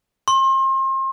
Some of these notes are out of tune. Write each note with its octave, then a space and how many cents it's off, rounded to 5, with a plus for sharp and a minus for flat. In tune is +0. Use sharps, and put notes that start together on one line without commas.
C6 +35